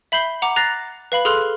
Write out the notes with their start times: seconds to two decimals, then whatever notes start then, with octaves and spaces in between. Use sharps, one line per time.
0.12 E5 B5 G6 C7 G7
0.42 F#5 A#5 D6
0.56 A#5 F#6 A6 A#6 C7
1.12 B4 F5 B5 F#7
1.25 G#4 A4 C6 F6 F#6 F7